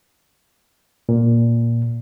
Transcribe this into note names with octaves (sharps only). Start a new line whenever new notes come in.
A#2